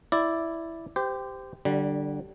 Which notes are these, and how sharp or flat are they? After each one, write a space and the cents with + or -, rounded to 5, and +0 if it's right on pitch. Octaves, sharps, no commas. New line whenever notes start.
E4 +0 D5 +0
G4 +0 C5 -30
D3 +10 G3 -20